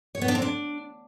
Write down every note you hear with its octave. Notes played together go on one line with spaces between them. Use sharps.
C#5
B3
D4
C4
D4